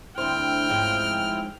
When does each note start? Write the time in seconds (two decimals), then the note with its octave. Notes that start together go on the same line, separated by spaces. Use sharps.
0.18 D2 C4 E4 C5 G5 F6
0.69 G#2 F3 C#4